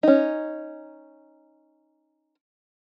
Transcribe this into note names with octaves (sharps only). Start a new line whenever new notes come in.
C#4 D#4